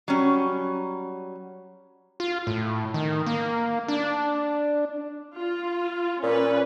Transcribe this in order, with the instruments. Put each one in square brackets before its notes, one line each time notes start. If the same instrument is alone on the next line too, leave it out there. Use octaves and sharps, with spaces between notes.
[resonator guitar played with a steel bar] F#3 G3 C#4
[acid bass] F4
A2
D#3
A#3
D4
[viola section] F4
[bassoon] A#2 [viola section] C#4 B4